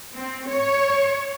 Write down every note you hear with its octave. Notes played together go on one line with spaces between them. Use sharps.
C4
C#5